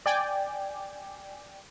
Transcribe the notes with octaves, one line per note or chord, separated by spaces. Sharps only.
D5 G5 G#5